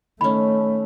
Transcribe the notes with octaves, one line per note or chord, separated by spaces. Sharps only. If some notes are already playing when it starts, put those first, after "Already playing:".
D#3 A3 C#4 B5